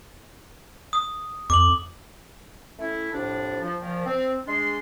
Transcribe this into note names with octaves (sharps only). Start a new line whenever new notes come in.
D#6
F2 D6 F#7
A3 C#4 E4
C2 F2 A2 D4
F3
A#2 D#3 F3
C4
G#3 D4 C6